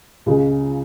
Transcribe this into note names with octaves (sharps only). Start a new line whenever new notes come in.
C#2 C#3 G#3